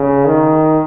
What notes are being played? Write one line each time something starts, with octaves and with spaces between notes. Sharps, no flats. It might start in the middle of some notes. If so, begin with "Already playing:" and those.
Already playing: C#3
D#3